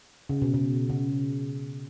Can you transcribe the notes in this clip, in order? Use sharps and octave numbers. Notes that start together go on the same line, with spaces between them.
C#3
B2
B2
C#3